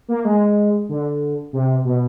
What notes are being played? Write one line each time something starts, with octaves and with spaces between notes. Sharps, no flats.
A#3
G#3
D3
C3
B2